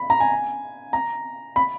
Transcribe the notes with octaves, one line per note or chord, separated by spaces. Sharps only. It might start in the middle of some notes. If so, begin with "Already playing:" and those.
Already playing: B5
A#5
G#5
A#5
B5